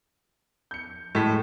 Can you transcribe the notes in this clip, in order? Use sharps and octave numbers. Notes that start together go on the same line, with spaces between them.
G6 C#7
A2 G#3 B6 E7